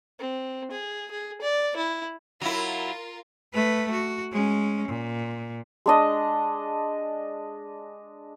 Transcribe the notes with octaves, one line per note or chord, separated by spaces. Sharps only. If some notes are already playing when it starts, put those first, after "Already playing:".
C4
G#4
G#4
D5
E4
F#3 E4 F4 A#4
A3 B4
F#4
G#3 C#4
A#2
G#3 D4 D#5